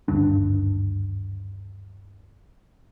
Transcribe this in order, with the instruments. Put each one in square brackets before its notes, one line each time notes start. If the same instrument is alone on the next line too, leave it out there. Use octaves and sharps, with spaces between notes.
[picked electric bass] G#1 D2 G2 D4